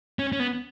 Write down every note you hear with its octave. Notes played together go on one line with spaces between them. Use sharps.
C#4
C#4
B3